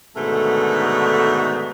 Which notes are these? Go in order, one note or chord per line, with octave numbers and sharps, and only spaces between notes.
G#2 B2 D3 D#3 A3